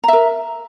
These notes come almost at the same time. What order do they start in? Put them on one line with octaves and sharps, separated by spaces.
A#5 E5 A#4